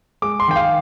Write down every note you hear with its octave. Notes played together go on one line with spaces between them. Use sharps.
G#3 D6
C6
D#3 G5
F5